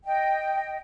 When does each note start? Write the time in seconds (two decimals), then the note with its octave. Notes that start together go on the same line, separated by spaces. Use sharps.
0.05 D#5 G5